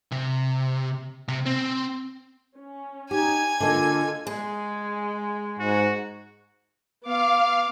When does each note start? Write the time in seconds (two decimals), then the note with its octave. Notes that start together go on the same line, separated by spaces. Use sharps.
0.11 C3
1.28 C3
1.46 C4
2.56 C#4
3.11 D#4 G4 G#5 G#6
3.60 D3 A#3 F4 A4 D#5
4.27 G#3 G#4
5.59 G#2 F#4
7.04 B3 F5 D6